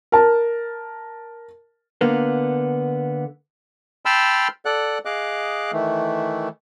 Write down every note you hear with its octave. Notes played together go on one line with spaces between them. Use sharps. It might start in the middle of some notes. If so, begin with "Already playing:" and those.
A#4 A5
D3 A#3 B3
G5 A5 B5 C6 E6 F6
A4 D5 F#5 F#6
G#4 D#5 F5 D6 F#6
D#3 E3 A3